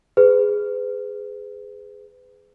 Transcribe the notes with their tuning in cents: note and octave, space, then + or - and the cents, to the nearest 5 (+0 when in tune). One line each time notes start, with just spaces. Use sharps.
G#4 +0 B4 +35